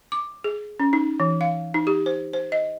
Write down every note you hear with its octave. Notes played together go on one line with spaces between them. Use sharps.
D6
G#4
C#4
D#4
E3
F5
D#4
G4
C5
C5
D#5